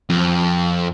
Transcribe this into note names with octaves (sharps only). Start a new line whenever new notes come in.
F2